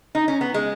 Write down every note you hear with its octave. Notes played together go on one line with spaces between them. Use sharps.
D#4
C#4
B3
G#3